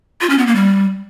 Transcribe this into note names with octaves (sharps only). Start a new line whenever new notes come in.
F4
C#4
B3
A#3
G3